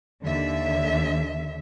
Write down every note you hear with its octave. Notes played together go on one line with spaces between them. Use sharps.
D#2 D3 E5